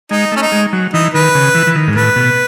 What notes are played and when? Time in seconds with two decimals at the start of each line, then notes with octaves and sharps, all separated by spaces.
0.11 G#3 D#4
0.32 A3 C#4
0.42 D#4
0.52 G#3
0.73 F#3
0.94 E3 D#4
1.14 D#3 B4
1.35 C#3
1.55 E3
1.67 E3
1.75 D#3
1.88 G#2
1.95 A2 B4
2.16 B2